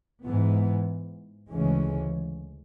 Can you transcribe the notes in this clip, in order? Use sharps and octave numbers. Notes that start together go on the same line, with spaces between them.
G#2 E3 B3
D2 C#3 E3 G#3 C#4